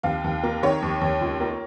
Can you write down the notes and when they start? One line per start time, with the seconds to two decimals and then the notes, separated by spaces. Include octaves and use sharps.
0.03 D#2 F5
0.24 D#2
0.43 A#3
0.62 D#3 C#5
0.82 D#2
1.01 D#2
1.21 C#2
1.40 A#3